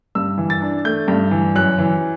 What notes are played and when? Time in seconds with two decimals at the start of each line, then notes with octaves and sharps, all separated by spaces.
0.15 G2 E6
0.38 E3
0.50 A6
0.61 D4
0.84 A3 G6
1.08 G2
1.31 E3
1.56 F#2 F#6
1.78 E3